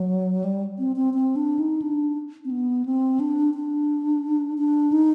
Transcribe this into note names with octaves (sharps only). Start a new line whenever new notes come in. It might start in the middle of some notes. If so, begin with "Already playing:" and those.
Already playing: F#3
G3
C4
C4
C4
D4
D#4
D4
C4
B3
C4
D4
D4
D4
D#4